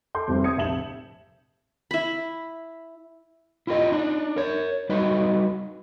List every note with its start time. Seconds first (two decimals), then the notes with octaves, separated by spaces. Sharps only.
0.15 A4 C6 D6 G6
0.28 F1 C2 C5
0.44 D#6 G#6 C#7
0.57 F1 A#1 E5 A5 E7 F#7
1.91 E4 B5
3.67 E4 F4 G4 A#4 D#5
3.92 D4 D#4
4.36 A#4 C#5
4.89 G3 D#4 F#4 B4 D#5